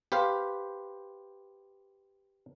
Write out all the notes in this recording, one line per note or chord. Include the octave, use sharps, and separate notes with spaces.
G4 B4 C5 F5